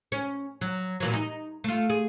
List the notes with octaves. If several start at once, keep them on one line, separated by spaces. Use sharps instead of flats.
C#4
F#3
A#2 E3 F#3
D#4
A3 F4
G#4